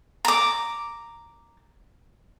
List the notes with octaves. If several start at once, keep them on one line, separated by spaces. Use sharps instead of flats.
A#5 D6